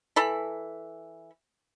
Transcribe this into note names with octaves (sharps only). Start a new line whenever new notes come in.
E3 A4 B5